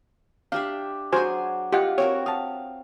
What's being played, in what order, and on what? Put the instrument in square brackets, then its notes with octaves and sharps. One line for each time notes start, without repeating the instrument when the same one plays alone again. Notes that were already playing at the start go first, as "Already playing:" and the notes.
[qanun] D4 G4 E5 [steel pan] F5
[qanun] F#3 D4 G#4 [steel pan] F#4 C5 G#5
[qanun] F4 [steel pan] G4 D#5 F#5
[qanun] C4 F#4 A#4 [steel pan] C#5
[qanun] F5 [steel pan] A5 D#6